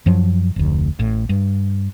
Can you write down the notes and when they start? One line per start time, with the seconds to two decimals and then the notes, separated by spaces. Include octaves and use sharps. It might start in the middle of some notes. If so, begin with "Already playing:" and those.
0.06 F#2 F3 F#3
0.56 F1 D2
0.99 A1 A2
1.29 G2